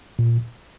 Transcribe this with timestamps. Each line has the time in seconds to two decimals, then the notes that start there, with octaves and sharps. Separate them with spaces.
0.19 A#2